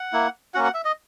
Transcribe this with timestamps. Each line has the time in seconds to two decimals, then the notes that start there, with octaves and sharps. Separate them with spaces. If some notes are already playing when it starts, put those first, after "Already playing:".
Already playing: F#5
0.13 A#3 E4
0.54 A#3 C#4 F#4 F#5
0.64 F#5
0.74 E5
0.85 D#5